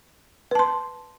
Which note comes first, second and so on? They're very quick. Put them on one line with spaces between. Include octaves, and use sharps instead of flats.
B4 A5 C6